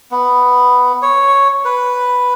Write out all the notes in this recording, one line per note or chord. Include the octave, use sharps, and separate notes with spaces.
B3
C#5
B4